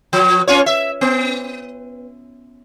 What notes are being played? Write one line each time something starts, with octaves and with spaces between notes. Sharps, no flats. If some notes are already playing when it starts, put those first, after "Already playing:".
F3
C#4 F4 C#5
E5
B3